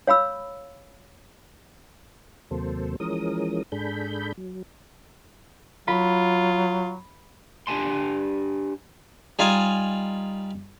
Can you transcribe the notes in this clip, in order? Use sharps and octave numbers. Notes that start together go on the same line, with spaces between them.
C#5 F5 B5 E6
D#2 C3 F#3 A#3 A4 C5
E3 F3 G#3 C#4 A#4 D#6
G#2 D4 G#4 A4 B5 G6
F#3
F#3 F4 B5
D4 G4 G#5 A5 C6
G3 D#4 F4 G#5 A5